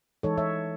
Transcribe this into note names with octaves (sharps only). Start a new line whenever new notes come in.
E3 G#3 D#4 A4 C#5
C#5 E5